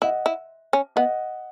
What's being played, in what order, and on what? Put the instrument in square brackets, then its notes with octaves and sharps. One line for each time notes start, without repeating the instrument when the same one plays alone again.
[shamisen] E4 [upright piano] D#5 F#5
[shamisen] E4
C#4
[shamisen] B3 [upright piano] D#5 F#5